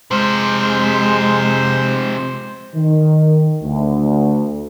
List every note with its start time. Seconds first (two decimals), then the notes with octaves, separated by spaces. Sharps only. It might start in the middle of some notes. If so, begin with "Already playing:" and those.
0.11 C3 F3 G#3 C5
2.75 D#3
3.63 D2